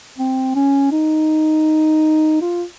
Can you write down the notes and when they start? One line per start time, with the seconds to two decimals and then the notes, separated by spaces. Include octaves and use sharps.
0.18 C4
0.55 C#4
0.92 D#4
2.41 F4